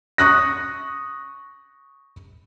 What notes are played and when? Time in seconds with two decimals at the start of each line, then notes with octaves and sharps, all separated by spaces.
0.18 C#6 D#6 F#6 A#6